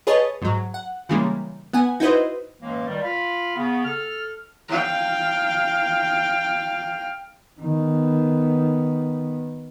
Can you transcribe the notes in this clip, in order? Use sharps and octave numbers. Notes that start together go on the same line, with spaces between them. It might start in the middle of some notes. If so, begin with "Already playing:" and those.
G#4 B4 C#5 D#5 A5
G#2 F#3
F#5
C#3 E3 G3 G#3 A#3
B3 F#5 G#5
D#4 E4 F#4 B4 C5 D#5
F#2 A2 E3 G#3 A#3
C#2 D#3 G3
F4 F5 B5
C#3 B3
A4 F6
F5 G5
D#3 B3